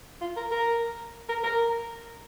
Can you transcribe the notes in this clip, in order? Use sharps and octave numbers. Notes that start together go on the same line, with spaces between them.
F4
A#4
A#4
A#4
A#4